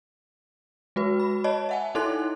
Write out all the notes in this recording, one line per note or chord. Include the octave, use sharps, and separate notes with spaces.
G#3 F#4 B4
B5
C#5 D#5 A5 B5
E5 F#5 G#5
D#4 E4 A4 C#5 C6 F#6